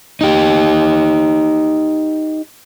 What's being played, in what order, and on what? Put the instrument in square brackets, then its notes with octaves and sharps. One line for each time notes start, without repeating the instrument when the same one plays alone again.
[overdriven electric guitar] D#4 G4